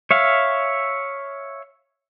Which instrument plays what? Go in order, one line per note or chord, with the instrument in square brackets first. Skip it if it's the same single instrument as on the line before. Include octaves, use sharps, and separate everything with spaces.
[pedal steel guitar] C#5 E5 F5